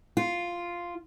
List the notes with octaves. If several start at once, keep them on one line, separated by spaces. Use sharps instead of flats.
F4